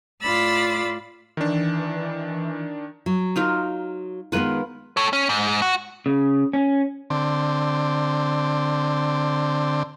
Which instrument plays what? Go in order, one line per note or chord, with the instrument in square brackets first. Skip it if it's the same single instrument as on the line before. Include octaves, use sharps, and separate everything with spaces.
[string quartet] A2 F4 D5 B5 E6 A6
[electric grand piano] D#3 D4 [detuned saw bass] E3
[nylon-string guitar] F#3
[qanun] D#4 F4 A#4
[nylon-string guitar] D#3 G#3 B3 [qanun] F4 B4
[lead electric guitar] A4 C#5
C#4
G#2
F#4
[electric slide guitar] C#3
C#4
[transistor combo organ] D3 C4